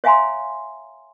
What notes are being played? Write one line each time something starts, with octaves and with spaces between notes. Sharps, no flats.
C#5 E5 F5 G#5 A#5 C6